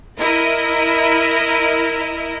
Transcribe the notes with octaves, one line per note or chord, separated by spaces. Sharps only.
E4 A#4 D#5